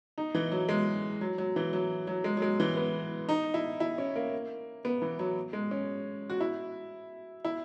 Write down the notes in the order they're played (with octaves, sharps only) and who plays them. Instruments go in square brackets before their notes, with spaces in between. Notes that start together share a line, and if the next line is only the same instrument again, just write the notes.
[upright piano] D#4
E3
F#3
G#3
F#3
F#3
E3
F#3
F#3
G#3
F#3
G#3
E3
B3
D#4
E4
E4
C#4
A#3
B3
E3
F#3
G#3
C#4
F#4
E4
E4